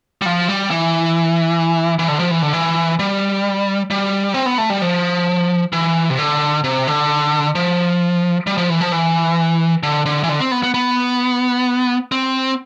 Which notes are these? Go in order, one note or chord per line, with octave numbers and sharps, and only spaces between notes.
G3
F3
G3
E3
E3
D3
F3
E3
D3
E3
G3
G3
C4
B3
A3
G3
F3
E3
C3
D3
C3
D3
F3
G3
F3
E3
F3
E3
D3
D3
E3
D3
C4
B3
B3
B3
C4